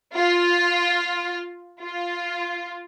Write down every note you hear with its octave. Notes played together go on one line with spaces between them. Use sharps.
F4
F4